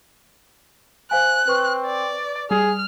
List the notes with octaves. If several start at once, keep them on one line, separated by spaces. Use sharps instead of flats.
C5 F5 G#5 F#6
C4 B4 C#6
D5
G3 G#4 F6